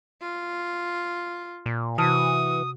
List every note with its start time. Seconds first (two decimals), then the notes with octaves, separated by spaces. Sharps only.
0.22 F4
1.66 A#2
1.98 C3 E3 F#4 A5 D#6 F6